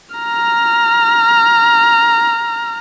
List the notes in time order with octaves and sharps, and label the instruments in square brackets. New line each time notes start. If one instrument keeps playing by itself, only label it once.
[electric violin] A#5 F6